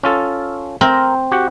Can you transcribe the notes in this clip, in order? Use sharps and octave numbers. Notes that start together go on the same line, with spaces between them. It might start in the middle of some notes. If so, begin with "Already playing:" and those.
C#4 F4 A4
C4 A#4 A#5
F#4 G4 F#5